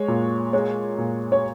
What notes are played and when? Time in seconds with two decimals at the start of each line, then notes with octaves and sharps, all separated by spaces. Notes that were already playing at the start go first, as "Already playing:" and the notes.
Already playing: G#3 C#5
0.08 A#2
0.53 G#3 C#5
0.98 A#2
1.32 C#5